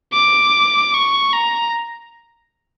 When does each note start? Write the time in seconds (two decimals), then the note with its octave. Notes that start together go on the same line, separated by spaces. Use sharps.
0.13 D6
0.94 C#6
1.33 A#5